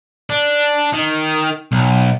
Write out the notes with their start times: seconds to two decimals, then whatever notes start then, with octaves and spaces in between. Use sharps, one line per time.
0.30 D4
0.93 D#3
1.72 B1